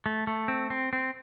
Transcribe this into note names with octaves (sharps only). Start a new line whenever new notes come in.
A3
A3
C4
C4
C4